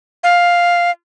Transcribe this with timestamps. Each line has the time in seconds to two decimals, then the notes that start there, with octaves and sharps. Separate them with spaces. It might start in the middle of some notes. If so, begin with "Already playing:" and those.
0.24 F5